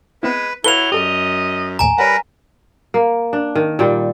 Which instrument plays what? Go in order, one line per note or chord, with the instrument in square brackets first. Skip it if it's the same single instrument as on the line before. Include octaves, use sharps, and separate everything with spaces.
[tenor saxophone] G#3 [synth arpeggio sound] B3 C4 E4 [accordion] B4
[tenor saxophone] F#3 [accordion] E4 [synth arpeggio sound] A4 B4 F5 [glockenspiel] F7 G7
[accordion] F#2 [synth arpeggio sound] G4 A4 D5 [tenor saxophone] D#5
[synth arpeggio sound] A#1 D#2 A2 [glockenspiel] G#5 A#5
[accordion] G3 A#4 B4 [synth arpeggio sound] C#5 F#5
[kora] A#3
D4
D#3
A#2 G3 G5